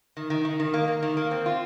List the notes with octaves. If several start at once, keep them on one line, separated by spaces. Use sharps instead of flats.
D#3
D#3
D#3
D#3
A#3
A#3
D#3
A#3
C4
F4